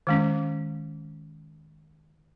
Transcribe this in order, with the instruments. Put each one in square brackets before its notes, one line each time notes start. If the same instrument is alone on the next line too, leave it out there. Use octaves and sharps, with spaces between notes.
[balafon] D#3 G#3 C#4